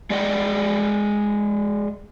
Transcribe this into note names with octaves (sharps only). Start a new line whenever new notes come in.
G#3 G#4 D5 D#5 F#5 G5